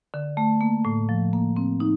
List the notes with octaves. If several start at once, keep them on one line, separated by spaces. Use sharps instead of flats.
D3
A3
A#3
A2
F3
A#3
C4
D#4